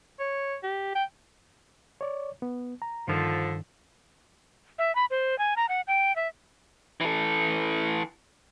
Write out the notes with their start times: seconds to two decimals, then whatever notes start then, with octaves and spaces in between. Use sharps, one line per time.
0.20 C#5
0.63 G4
0.95 G5
2.01 C#5 D5
2.42 B3
2.82 A#5
3.08 G2 D3 D#3 F3 D4
4.79 E5
4.96 B5
5.10 C5
5.39 G#5
5.56 A#5
5.69 F#5
5.88 G5
6.16 E5
7.01 E3 A4